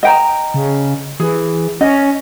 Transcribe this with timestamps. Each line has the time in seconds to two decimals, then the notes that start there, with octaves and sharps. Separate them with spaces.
0.03 D#5 G5 A#5
0.54 C#3
1.20 E3 G#4
1.81 C#4 D#5